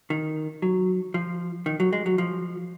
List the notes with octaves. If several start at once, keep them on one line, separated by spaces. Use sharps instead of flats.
D#3
F#3
F3
D#3
F#3
G#3
F#3
F3